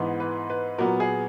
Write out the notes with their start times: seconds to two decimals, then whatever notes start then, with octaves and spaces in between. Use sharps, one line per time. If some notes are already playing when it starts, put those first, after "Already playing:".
Already playing: G#2 E3 B3
0.20 B4
0.50 B4
0.78 A#2 F#3 B3 A#4
1.00 G#4